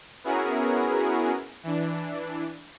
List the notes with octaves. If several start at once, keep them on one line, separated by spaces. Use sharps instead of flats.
B3 C#4 E4 F#4 G#4 A#4
E3 D4